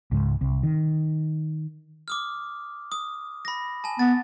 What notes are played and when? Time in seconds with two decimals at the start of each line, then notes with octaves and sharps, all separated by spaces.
0.12 C#2 G#2
0.41 C2
0.63 D#3
2.08 D6 D#6 F6
2.92 D#6
3.45 B5 A#6
3.84 G#5 A5
3.99 B3 A6